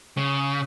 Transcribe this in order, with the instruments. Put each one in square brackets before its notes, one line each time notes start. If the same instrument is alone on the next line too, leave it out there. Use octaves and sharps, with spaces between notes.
[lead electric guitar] C#3